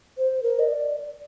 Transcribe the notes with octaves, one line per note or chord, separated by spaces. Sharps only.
C5
A#4
D#5
D5